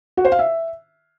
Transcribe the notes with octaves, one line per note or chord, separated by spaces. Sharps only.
F#4
C5
F5
E5